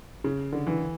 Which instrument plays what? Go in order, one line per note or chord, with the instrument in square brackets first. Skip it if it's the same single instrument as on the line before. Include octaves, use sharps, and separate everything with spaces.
[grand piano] C#3
D3
E3